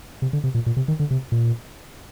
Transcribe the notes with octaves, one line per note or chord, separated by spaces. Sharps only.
C3
D3
C3
A#2
A#2
C3
D#3
D3
C3
A#2